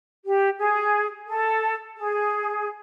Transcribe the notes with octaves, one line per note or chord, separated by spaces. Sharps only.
G4
G#4
A4
G#4